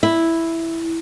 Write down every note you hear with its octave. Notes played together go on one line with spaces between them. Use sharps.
E4